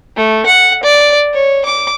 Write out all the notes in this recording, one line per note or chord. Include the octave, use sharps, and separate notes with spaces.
A3
F#5
D5
C#5
D6